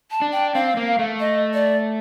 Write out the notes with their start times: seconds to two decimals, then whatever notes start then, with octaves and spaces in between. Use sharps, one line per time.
0.11 A5
0.22 D4
0.32 G5
0.54 C4 F5
0.77 A#3
0.99 A3
1.20 D#5
1.54 D5